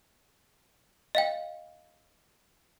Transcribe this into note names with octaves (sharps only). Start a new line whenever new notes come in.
D#5 F5 G5